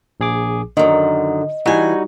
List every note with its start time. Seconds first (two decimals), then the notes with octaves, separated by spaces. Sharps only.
0.20 A#1 G#4 D6
0.77 F#2 D3 D#3 D#5
1.66 E3 G3 D#4 F#4 G#5